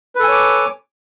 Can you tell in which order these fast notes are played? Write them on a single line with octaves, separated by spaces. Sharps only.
B4 A4 G#5 C#5 D6